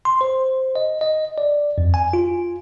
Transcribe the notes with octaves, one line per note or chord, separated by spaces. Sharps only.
C6
C5
D#5
D#5
D5
F2
G#5
F4